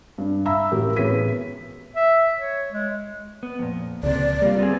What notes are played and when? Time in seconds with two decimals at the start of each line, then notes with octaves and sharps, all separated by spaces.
0.18 G2
0.45 E5 F5 A#5 B5 E6
0.72 A1 F#4 G4 A#4
0.96 A1 B3 G#4 C#5 B6 D#7
1.96 E5
2.35 C#5
2.72 G#3
3.43 B3
3.59 F2 A#2
4.03 C#2 C3 D5
4.42 G3 A#3 F4
4.59 B3 C4 G#4